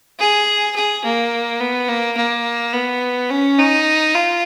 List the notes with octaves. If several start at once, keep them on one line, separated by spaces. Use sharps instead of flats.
G#4
G#4
A#3
B3
A#3
A#3
B3
C#4
D#4
F4